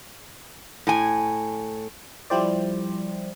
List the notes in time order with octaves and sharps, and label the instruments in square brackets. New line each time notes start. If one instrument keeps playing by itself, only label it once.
[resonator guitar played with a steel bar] A2 G#5
[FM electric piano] F3 G3 E4 G4 C5 D5